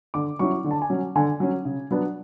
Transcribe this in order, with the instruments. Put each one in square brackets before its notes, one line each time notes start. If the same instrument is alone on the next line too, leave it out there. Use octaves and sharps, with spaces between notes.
[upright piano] D3 D6
F#3 C#4 E4 C#6
D3
A5
G#5
F#3 C#4
D3 G#5
F#3 C#4
C#3
F#3 B3 D4